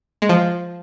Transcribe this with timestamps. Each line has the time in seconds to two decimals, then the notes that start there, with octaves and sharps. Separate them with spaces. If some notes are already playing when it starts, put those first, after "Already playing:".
0.22 G#3
0.29 F3